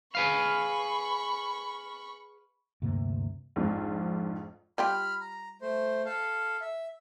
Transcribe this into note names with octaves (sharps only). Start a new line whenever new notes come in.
G#4 B4 F5 B5 C#6
D2 G2 C3 A#3
A#1 F2 G#2
G3 F4 G4 B5 F6
A#5
A3 C5
A4 F5
E5